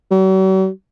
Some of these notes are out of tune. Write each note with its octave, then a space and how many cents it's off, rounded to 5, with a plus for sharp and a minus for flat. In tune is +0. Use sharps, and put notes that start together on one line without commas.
F#3 +45